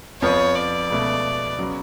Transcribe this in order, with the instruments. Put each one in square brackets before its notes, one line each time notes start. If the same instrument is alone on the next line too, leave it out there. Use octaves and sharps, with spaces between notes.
[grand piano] F2 F3 B3 [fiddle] C#5
[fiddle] D5
[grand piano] C#2 B2 A3
C#3 F#3 B3